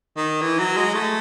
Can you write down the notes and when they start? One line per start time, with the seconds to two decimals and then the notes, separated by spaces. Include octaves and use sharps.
0.16 D#3
0.41 E3
0.59 F#3
0.77 G#3
0.94 A3